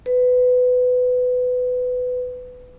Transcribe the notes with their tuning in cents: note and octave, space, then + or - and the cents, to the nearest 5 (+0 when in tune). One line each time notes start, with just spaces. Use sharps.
B4 +20